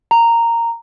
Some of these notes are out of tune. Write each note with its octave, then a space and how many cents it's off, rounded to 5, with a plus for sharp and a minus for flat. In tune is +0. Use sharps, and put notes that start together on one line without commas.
A#5 -10